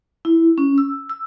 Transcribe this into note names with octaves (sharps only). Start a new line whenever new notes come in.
E4
C#4
E6
E6